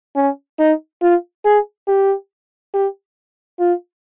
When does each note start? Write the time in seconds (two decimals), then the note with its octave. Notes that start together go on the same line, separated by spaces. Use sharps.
0.15 C#4
0.59 D#4
1.02 F4
1.45 G#4
1.87 G4
2.73 G4
3.60 F4